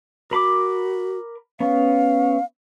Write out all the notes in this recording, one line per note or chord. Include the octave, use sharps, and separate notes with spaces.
F#4 A#4 B5 D6
B3 C#4 F5